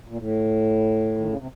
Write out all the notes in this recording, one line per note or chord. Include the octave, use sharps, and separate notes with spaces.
A#2
A2
D#3
C#3
C3